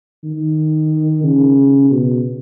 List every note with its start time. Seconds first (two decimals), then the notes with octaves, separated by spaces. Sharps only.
0.24 D#3
1.23 C#3
1.90 B2